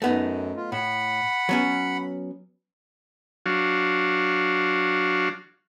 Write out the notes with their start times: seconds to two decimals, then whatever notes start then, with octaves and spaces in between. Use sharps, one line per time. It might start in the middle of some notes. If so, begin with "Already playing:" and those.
0.02 F#2 A3 B3 D#4
0.56 F4
0.72 A2 F#5 B5
1.49 F#3 B3 C#4
3.46 F#3 D4 F#4 F5